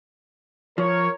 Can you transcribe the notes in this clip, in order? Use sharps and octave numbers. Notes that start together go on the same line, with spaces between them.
F3 A#4 C#5